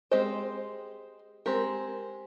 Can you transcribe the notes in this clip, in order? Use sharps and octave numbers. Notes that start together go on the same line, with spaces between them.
G#3 C4 G4 C5 D#5
G#3 C4 G4 A#4